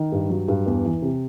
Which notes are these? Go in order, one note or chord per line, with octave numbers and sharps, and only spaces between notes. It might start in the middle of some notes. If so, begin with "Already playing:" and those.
Already playing: D#3
G2
F#3
G2
E2
E3
C3